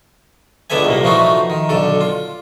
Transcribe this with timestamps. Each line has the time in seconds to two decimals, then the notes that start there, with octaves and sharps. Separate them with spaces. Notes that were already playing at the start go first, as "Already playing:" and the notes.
0.70 C#2 D3 B3 A4 E5 G#5
0.87 C2 A#2 A#3
1.04 E3 F3 A3 D#4 F4 F#4
1.50 D#3
1.69 B1 D3 A4
2.01 F4